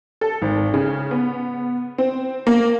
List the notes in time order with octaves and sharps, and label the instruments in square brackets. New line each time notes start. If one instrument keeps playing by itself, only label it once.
[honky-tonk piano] A4
G#1
C#3
B3
C4
A#3